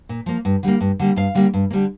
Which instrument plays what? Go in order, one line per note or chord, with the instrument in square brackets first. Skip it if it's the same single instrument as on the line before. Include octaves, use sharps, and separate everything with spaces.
[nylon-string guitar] A#2
F3 A#3
G2
D3 G3 A#3
G2
D3 G3 A#3
G2 F5
D3 G3 A#3
G2
A#3
D3 G3